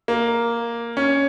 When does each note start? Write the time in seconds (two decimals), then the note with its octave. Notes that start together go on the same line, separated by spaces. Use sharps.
0.08 A#3
0.97 C#4